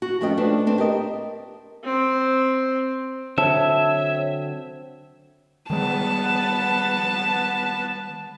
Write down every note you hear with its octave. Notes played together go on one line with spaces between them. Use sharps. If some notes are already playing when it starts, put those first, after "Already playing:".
F#4
F2 F3 A3 C#4 D#5 G5
A3 D4 B4 C5
C4 D4 A4
G4 A#4 D#5
C4
D3 F#3 C4 C#5 E5 A5
D#3 G3 G#3 B3 A5